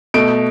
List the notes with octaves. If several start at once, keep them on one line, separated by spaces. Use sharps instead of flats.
B2 A3 D7